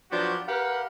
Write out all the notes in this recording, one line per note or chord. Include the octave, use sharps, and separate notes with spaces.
F3 F#3 B3 D4 F#4 G4
G4 A#4 B4 F5 F#5